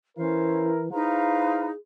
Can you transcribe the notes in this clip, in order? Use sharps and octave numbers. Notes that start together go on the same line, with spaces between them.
E3 C#4 E4 A#4 C5 F5
D#4 E4 G#4 B4 C5 F5 A#5